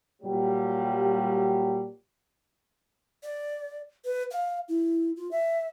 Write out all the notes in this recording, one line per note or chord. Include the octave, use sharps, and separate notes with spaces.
A#2 F#3 G3
D5
B4
F5
E4
F4
E5